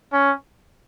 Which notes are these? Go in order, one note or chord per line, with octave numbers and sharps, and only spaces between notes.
C#4